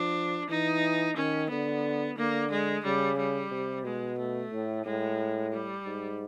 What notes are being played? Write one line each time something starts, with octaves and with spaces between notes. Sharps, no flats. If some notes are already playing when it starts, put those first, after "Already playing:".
Already playing: F3 D4
E3 D#4
D#3 C#4
D3 B3
D3 A#3
G#3
C#3 G3
G3
C3
B2 G#3
A3
A2
A2 G#3
G3
G#2